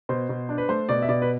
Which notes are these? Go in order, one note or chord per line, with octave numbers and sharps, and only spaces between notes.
B2 C5
B2
D4
B4
A3 C5
B2 D5
E5
B2 D5
B4